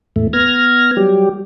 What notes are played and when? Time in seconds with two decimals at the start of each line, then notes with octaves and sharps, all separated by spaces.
0.16 E2 A2 A3
0.33 B3 F6 G#6 A#6
0.97 F#3 G3 G4